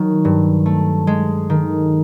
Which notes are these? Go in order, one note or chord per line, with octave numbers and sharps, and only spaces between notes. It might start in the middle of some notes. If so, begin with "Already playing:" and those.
Already playing: D#3 F#3
G2
A3
G#3
D#3